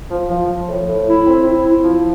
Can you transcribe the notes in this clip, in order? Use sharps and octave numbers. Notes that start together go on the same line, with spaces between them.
F3
F3
F3
A2
A2
E4
C4
E4
E4
F3